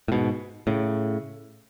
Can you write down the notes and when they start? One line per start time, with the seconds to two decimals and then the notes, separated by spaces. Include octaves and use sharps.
0.08 A2
0.12 G#2 B2
0.67 A2 C#3